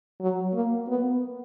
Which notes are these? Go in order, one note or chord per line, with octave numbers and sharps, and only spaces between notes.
F#3
A#3
B3